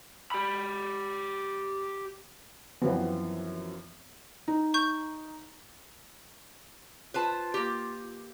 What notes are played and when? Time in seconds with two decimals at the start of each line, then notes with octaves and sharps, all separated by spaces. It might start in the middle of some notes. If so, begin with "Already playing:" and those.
0.32 G4 B5
2.82 F#2 E3 F3 B3 C4
4.48 D#4
4.74 C#6 G6
7.14 F4 B4 C5 A5
7.54 A#3 G4